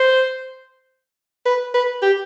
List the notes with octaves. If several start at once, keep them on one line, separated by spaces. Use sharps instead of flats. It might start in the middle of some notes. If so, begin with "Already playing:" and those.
Already playing: C5
B4
B4
G4